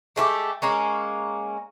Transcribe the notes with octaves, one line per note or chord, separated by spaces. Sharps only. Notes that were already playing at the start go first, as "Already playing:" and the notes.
G#3 A3 E4 G4
G#3 A#3 C#4